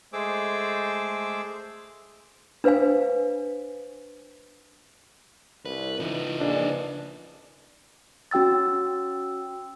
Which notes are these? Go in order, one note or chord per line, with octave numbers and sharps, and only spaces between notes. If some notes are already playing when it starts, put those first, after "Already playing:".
G#3 A3 G#4 C5 D6 E6
D4 B4 C5 F5 G#5
C2 B4
C#3 E3 D#4 F4 B4
A#1 D4 B4 D#5 G#5
C#4 F#4 G5 E6 A6